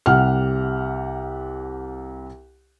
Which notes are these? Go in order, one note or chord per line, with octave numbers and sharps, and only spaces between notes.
C2 G4 F#5 F6